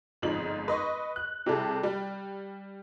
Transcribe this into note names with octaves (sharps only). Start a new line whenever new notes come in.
G1 F2 G#2 F3 D#4 F#7
B4 D#5 C6 C#6
F#6
C3 G3 E4 G#4 A4
G3